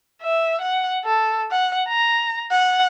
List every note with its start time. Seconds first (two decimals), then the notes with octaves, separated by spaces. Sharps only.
0.22 E5
0.61 F#5
1.05 A4
1.51 F#5
1.89 A#5
2.51 F#5